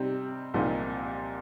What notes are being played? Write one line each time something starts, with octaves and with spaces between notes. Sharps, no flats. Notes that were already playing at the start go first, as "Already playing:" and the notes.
Already playing: C3 G3 C4 D#4
C2 A#2 F3 C4 D#4